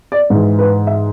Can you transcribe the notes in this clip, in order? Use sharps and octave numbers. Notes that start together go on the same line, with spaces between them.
D5
G#2 E3
B4
E5